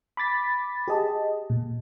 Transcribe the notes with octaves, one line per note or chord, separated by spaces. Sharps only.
B5 D6 A6 B6
G4 G#4 D#5 A5
A#2